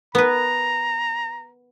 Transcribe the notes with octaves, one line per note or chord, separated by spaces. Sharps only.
B3 B4 A#5